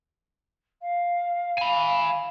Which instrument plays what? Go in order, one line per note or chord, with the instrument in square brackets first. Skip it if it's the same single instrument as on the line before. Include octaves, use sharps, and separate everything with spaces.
[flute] F5
[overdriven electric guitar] G#5 B5